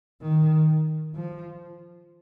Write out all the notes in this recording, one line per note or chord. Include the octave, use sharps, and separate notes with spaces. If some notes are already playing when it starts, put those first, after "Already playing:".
D#3
F3